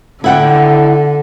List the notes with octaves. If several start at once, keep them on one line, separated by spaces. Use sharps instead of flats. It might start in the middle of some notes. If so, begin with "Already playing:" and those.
D3 E4 F#5 G5